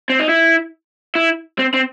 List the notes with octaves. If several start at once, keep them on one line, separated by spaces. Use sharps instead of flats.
C4
D#4
E4
E4
C4
C4